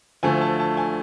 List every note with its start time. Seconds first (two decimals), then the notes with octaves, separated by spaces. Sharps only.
0.23 D2 D3 F3 A3 G#5
0.41 A5
0.60 A5
0.77 G#5